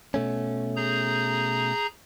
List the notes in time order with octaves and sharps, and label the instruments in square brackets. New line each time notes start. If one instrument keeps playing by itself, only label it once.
[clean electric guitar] B2 A3 C#4
[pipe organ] G#4 A#5 G6